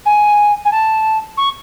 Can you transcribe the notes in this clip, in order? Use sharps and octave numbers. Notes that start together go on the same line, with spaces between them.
G#5
G#5
A5
C#6